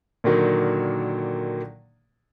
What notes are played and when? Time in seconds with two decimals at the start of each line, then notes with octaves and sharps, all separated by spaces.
0.24 A#2 D3 D#3 F#3 A#3